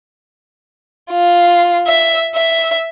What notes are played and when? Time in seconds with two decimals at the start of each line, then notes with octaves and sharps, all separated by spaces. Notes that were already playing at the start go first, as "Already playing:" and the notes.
1.12 F4
1.87 E5
2.35 E5